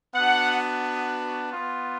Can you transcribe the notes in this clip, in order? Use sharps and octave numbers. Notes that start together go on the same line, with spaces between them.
B3 D4 F#4 F#5
B3 F4